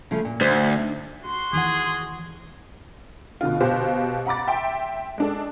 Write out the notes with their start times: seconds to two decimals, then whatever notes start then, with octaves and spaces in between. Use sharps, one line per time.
0.11 C#3 F3 A3
0.25 A#2
0.41 D2 C5
0.79 D4 D#4
1.23 F#4 C6
1.53 D#2 E3 G#4 F#5
3.41 B2 D3 F4
3.60 B2 G4 C5 F5
4.26 F#5 A#5 B5 D6 A6
4.47 E5 G5 C6
5.18 G#3 D4 A4